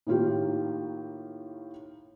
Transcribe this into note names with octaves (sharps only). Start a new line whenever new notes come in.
A2 D#3 A#3 F4 G4